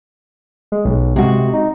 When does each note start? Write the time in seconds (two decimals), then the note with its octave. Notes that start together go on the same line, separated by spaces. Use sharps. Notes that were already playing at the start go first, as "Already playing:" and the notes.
0.72 G#3
0.85 B1
1.16 C3 G#3 F#4
1.53 D#4